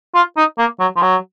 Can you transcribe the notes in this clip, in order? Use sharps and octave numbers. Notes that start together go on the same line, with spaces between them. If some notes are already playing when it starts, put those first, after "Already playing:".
F4
D#4
A#3
F#3
F3
F#3